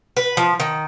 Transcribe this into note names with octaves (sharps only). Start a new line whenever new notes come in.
B4
F3
D#3